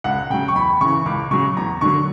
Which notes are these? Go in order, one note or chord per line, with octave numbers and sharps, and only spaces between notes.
C#2 F#5
C#3 F#3 G5
C#6
E2 B5
C#3 E3 C#6
C#2 D6
C#3 F#3 C#6
E2 A#5
D3 F#3 C#6